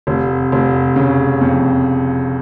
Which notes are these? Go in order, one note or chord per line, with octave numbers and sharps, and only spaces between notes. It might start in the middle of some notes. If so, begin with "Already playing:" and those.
F1
F1
C#3
F2